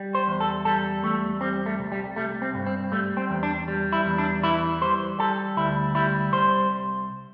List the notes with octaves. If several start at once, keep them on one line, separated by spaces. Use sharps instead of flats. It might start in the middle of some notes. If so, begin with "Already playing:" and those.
Already playing: G3
C5
E2
A4
G3 A4
E2 A3
G3 C4
A3
C2
G3
G3 A3
C4
G2
C4
G3 A3
C4
E2
D4
G3
E4
E2
D4
E3 E4
G3 C5
G3 A4
D2 E4
G3 E4
C2 C5